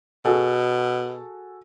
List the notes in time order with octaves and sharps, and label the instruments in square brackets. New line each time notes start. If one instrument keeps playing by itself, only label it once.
[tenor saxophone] B2 [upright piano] F#4 G#4 A4